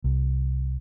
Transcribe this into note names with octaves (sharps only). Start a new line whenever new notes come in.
C2